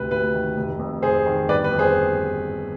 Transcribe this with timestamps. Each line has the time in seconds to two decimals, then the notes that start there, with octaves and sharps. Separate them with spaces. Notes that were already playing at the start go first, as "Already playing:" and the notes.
Already playing: D2 C3 B4
0.11 D2 B4
0.34 D#3
0.56 F1
0.79 F2
1.02 F1 G#4 C5
1.26 D#3
1.48 G1 B4 D5
1.64 B4
1.71 F2
1.79 G#4 C5